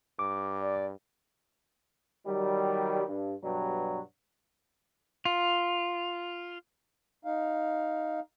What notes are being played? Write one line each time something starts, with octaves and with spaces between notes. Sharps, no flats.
G2 D6
D5
D#3 F#3 G3
G2
G2 B2 F#3 G3
F4
D#4 F5